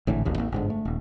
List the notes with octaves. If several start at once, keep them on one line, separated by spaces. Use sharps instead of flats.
G#1 A2 D3 E3
D1 G#1 D#2
G#1 A#3
G1 G#2 D3
A3
D#1